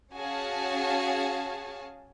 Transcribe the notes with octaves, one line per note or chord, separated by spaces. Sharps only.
C#4 F#4 G#4 F5 G#5 A5